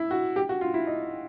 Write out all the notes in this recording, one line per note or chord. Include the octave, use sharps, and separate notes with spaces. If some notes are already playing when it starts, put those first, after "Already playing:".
Already playing: E4
F#4
G4
F#4
F4
E4
D#4